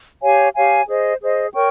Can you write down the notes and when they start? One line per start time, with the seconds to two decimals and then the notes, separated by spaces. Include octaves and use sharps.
0.22 G4 C#5 F5 G#5
0.55 G4 C#5 F5 G#5
0.87 G#4 C5 D#5
1.22 G#4 C5 D#5
1.54 A#4 C#5 G5 C#6